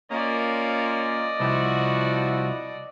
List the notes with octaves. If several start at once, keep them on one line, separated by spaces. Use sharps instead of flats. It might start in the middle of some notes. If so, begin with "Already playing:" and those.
A#3 C#4 F4 D5 D#5
C2 F3 E4 F#4